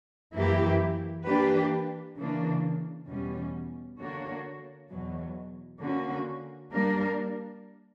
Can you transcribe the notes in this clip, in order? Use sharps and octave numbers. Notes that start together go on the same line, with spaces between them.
F#2 E3 A#3 E4 G4
E3 A#3 D4 G4 B4
C#3 E3 A#3 D4
E2 B2 G3 C#4
D3 A#3 D4 F#4 C#5
E2 B2 F#3
D3 A#3 C#4 F#4
G3 A#3 D4 A#4